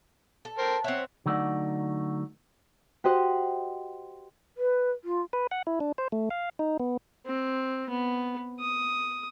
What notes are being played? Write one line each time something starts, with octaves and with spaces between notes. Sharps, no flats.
A4
A#4 C5 G5
C4 C#5 E5 F#5
D3 F#3 A3 D#4 D5 F#5
F#4 G4 C5 D#5 F#5
B4
F4
B4
F#5
E4
D4
C5
A3
F5
D#4
B3
C4
B3
D#6